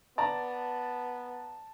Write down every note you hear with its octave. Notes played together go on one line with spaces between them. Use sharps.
B3 D5 A5 A#5